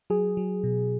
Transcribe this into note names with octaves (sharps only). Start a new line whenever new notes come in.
F#3 G#4
F#3
B2